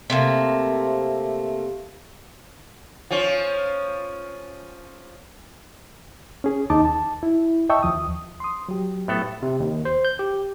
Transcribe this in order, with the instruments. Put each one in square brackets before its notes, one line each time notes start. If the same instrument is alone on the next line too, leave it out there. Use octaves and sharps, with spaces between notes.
[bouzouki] C3 A3 A#3
[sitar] F3 C#4
[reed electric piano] C#4 G#4
D#2 D#4 D#5 A5 D6
A5
E4
D#5 E5 G5 A5 C#6 E6
D#2 F3 D#6
C6 D#6
F#3 G4
[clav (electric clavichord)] A2 B3 A4
[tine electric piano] C3
D#2
C5
G6
G4